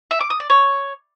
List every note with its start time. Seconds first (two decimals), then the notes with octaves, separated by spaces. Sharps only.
0.11 E5
0.21 D6
0.30 D#6
0.40 D5
0.50 C#5